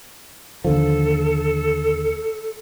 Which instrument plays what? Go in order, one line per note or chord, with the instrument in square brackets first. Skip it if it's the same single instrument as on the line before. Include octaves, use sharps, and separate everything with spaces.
[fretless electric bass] D#2 D3 F3 [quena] A4